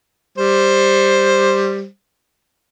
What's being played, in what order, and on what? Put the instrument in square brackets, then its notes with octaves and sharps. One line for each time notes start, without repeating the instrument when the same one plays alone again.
[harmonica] G3 C5